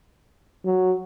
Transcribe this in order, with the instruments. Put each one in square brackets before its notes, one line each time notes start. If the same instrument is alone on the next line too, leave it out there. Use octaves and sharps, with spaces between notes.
[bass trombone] F#3